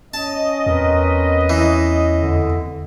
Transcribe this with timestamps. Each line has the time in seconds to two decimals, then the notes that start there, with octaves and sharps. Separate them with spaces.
0.14 C#4 D#5 A5
0.66 E2 C4 A#4 B4
1.50 E3
2.18 F2 D3